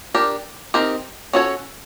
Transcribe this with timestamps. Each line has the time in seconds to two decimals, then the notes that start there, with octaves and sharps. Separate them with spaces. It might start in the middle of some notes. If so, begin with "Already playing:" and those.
0.14 D4 G4 A#4
0.74 C4 D#4 G4 A#4
1.33 C#4 F#4 A4 C#5